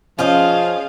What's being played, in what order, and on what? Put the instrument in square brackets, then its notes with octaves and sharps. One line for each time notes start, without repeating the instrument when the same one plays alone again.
[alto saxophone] F3 [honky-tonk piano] C#4 [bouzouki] F4 C5 D#5 [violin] G#4 F5